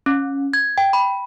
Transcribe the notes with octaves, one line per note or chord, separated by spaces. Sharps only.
C#4
G#6
G5
B5